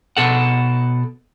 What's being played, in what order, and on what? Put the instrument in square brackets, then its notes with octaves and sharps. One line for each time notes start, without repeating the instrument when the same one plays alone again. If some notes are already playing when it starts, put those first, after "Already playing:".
[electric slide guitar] B2 A4 F#5